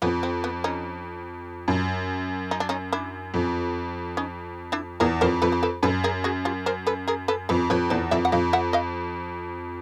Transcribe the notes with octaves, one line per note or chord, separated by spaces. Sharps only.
F2 B3 C#4
C4
B3
C#4 D#4
F#2
D#4
D4
C#4 D#4
D4 E4
F2
C#4 D#4
D4 E4
E2 G#4 A#4
F2 A#4 C5
F2 A4 B4
C5
A4 B4
F#2 A4 B4
G#4 A#4
F#4 G#4
F4 G4
A#4 C5
A4 B4
G#4 A#4
A4 B4
F2 A4 B4
F2 B4 C#5
E2 C5 D5
F2 D5 E5
F#5
F2 D#5 F5
E5 F#5
D#5 F5